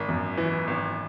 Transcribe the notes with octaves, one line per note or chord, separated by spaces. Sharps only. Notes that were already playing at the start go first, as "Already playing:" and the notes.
Already playing: G#1
F#2
E3
G#1